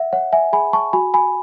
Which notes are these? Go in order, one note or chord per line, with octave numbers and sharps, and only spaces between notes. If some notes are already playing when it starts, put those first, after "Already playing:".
Already playing: E5 F#5
C#5 F#5
E5 G#5
G#4 G#5 B5
A5 C#6
F#4 G#5 B5
G#5 B5